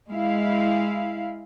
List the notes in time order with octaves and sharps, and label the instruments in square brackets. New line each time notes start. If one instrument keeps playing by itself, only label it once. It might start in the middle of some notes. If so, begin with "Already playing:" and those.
[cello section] G#3 E4 F5